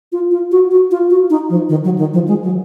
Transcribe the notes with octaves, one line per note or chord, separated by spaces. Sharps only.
F4
F4
F#4
F#4
F4
F#4
D#4
F3
D#3
F#3
D#3
F3
G#3
F#3